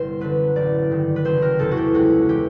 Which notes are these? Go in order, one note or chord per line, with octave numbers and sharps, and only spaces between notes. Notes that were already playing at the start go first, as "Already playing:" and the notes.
Already playing: G1 C3 E3 C5
F#2 D3 B4
A1 D5
G2 D#3
B4
F#1 C5
A#4
E2 C3 A4
F#4
G4
C#2 F#4
C3 E3 G4